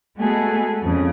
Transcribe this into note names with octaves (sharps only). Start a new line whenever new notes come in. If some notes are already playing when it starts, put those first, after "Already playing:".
G#3 A3 B3 F#4 G#4 A4
F2 C#3